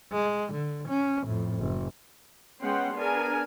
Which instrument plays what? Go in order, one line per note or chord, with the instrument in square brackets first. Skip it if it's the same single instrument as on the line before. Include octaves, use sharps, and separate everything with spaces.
[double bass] G#3
D3
C#4
F2 A2
F#1
[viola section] G#3 B3 C#4 F#5 G5 C6
B3 D4 G#4 A#4 G#5